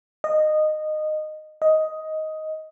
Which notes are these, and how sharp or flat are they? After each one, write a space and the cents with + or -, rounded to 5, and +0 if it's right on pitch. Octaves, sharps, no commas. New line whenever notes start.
D#5 -15
D#5 +10